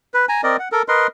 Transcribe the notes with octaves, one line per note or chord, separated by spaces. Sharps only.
B4
G#5 A#5
C4 A#4 D5 D#5
F#5
A4 A#4
A#4 B4 D#5 C6